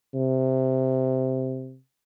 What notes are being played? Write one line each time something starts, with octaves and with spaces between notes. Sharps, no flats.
C3